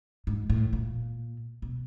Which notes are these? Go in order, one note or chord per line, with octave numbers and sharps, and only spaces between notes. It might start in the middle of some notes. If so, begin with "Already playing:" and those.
G#2
A2
A#2
B2